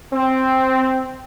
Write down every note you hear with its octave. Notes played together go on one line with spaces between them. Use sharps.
C4